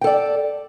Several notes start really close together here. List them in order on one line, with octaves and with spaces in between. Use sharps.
G5 A4 D5